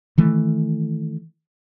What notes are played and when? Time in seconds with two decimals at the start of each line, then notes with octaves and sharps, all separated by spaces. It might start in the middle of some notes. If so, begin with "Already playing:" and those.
0.18 D#3 E3 A3